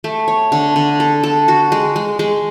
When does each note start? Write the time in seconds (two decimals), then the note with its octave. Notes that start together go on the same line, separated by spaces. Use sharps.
0.04 A3
0.28 C#5
0.52 D3
0.76 D3
1.00 A4
1.23 A4
1.48 F#4
1.72 G#3
1.96 G#3
2.19 G#3